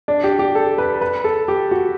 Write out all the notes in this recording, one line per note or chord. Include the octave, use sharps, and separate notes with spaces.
D4
G4
G4
A4
B4
B4
A4
G4
F#4